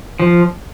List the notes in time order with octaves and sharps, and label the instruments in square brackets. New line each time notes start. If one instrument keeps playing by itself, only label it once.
[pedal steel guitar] F3